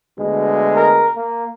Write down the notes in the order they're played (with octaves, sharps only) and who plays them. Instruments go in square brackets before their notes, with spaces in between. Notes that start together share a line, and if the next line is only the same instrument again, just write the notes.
[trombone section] D2 B2 G#3
[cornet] A#4
A#3